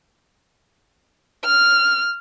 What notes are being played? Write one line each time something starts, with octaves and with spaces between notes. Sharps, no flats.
F6